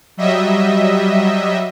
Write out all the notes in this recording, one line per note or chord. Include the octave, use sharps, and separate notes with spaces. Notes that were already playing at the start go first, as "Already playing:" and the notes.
F#3 G3 D#5 E5